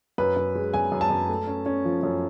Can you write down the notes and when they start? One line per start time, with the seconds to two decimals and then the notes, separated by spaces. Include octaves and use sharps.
0.18 F#2 B4
0.37 F#2
0.55 G#3
0.74 F#2 G#5
0.92 F#2
1.01 A5
1.10 F#2
1.29 A3
1.47 C#4
1.66 C#4
1.85 F3
2.03 F#2